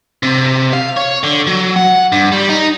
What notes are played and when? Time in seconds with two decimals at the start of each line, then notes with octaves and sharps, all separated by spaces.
0.23 C3
0.73 F5
0.97 C#5
1.23 D3
1.47 F#3
1.76 F#5
2.12 G2
2.32 G3
2.49 D#4